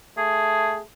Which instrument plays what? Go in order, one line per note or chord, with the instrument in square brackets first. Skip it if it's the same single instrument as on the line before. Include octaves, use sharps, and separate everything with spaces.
[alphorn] A3 [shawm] G#4